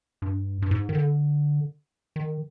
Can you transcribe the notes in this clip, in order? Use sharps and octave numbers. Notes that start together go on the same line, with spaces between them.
G2
G2
G#2
D#3
D3
D#3